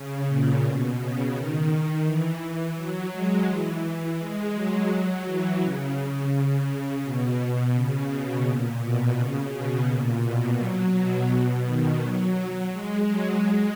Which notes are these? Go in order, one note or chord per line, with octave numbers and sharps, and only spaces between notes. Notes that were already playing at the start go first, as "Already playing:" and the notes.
Already playing: C#3
A#2
B2
C#3
D#3
E3
F#3
G#3
E3
E3
G#3
F#3
F#3
E3
C#3
C#3
B2
B2
C#3
B2
A#2
B2
C#3
B2
A#2
B2
F#3
B2
B2
D#3
F#3
G#3
F#3
G#3